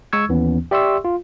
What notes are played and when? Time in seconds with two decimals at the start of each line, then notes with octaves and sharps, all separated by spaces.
0.13 G#3 C#6 E6 G#6
0.29 D#2 E3 B3 C#4
0.71 G4 D5 E5 C6 C#6 E6
1.05 F4